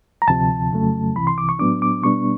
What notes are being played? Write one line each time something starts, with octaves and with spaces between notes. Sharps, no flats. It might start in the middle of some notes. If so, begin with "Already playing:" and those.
A#5
D2 C3 F3 A5
F2 C#3 F#3 A3
C2 C3 E3 B5
C6
D6
C#6
A2 F#3 B3 D4 D6
D6
B2 G3 B3 D4 C#6